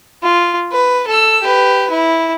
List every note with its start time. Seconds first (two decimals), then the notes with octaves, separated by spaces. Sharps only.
0.23 F4
0.72 B4
1.07 A4 E6
1.42 G4 B4
1.90 E4